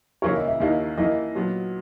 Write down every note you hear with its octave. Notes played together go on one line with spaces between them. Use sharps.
C#3 E3 A#3 E4 A#4 C#5
D#5
E5
D#2 D#3 A#3 E4 D#5
E3 A#3 E4 A#4 D#5
A#2 F#3 B3